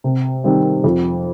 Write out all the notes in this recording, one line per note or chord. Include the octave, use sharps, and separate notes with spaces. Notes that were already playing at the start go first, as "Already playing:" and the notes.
C3
D#3 G3 C4
F2